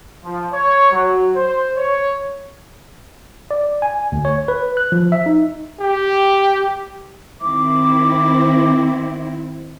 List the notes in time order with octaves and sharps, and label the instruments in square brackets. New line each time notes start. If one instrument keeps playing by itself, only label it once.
[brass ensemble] F3
C#5
F#3
C5
C#5
[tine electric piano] D5
G#5
D2
C#5
B4
F#6
F3
E5
D#4
[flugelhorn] G4
[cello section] D#3 C4 E4 [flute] D6